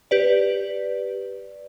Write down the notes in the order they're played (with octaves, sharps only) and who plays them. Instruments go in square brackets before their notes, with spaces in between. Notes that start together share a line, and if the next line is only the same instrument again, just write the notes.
[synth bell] G4 B4 D5